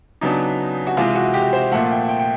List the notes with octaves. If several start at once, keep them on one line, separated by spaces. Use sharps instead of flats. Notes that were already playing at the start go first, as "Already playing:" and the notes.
C#3 F#3 B3 D4 D#4
F#4
C3 E3 G#3 F4
F#4
G4
C5
A#2 F3 A3 F#5
G5
G5
G5